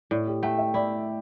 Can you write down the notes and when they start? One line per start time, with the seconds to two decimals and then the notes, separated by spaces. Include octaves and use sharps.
0.11 A2 D5
0.27 G4
0.43 A3 G5
0.58 E5
0.74 E4 D5